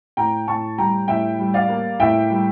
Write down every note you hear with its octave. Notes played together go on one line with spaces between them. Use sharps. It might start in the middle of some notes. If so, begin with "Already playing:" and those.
A2 G5 A#5
A2 A5 C#6
G3 G5 A#5
A2 E5 G5
G3
D5 F5
A#3
A2 E5 G5
G3